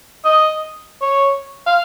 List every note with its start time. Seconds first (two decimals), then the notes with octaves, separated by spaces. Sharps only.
0.25 D#5
1.02 C#5
1.66 F5